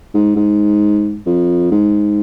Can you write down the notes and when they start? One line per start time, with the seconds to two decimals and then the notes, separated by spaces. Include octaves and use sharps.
0.14 G#2
0.36 G#2
1.26 F2
1.71 G#2